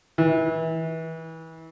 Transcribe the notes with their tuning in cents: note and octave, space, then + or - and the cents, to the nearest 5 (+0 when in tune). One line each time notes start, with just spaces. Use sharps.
E3 -25